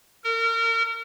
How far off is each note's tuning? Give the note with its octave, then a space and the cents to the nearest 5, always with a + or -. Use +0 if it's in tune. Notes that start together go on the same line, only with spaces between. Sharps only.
A#4 -30